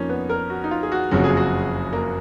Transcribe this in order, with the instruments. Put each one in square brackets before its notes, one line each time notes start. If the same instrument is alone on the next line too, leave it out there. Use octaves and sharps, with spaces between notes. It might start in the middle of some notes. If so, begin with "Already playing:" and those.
Already playing: [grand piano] F2 F3 A#3 [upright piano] C#4 D#4
[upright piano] B3
A#4
F#4
D#4
F4
G#4
F#4
[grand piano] F#1 F2 C#3 F#3 [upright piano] F#4
[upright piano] G#4
F#4
A#3